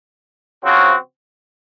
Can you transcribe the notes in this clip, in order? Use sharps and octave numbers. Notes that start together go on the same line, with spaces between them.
C#3 F3 C4 F#4